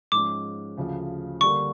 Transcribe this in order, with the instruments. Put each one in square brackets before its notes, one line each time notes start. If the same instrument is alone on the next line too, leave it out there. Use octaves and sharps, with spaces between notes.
[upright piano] G#2 F3 G#3 C#4 [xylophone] D6
[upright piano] D2 C#3 F3
[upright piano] D3 G3 A#3 [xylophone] C#6